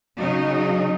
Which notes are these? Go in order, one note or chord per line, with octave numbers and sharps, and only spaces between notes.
C#3 F#3 D#4